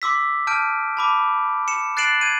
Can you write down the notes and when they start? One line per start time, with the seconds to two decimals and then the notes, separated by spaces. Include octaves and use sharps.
0.02 C6 D6 E6 B6
0.47 A5 F6 G6 D7
0.97 A5 B5 D6
1.68 C#7 E7
1.97 F#6 A6 C7 D7 E7 F#7
2.21 G#6 D#7